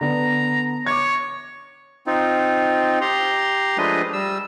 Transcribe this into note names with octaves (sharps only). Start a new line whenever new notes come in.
D3 B3 A#5
C#5 D6 G#6
C4 D#4 F4
G4 A#5 C6
F3 G#3 A3 D4 B4 D#5
G3 E6